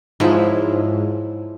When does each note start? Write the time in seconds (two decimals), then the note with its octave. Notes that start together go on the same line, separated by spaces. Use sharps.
0.20 G#2 F3 F#3 E4